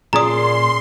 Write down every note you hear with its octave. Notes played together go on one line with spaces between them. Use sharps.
A#2 C#4 G#4 D5 A#5 C6 D#6